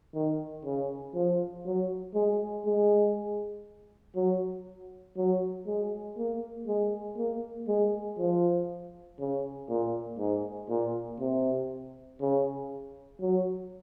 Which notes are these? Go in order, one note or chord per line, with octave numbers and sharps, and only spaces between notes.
D#3
C#3
F3
F#3
G#3
G#3
F#3
F#3
G#3
A#3
G#3
A#3
G#3
F3
C#3
A#2
G#2
A#2
C3
C#3
F#3